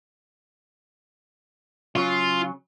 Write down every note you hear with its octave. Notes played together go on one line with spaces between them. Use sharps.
C#3 F#3 C#4 F4